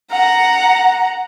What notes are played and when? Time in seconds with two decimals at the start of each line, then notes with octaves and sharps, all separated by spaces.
0.11 F#5 A#5